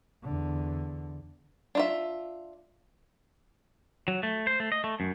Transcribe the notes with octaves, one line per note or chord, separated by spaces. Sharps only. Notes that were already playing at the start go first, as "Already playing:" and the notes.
E2 D3
D4 F4 E5
F#3
A3
C5
A3
D#5
A3
F#2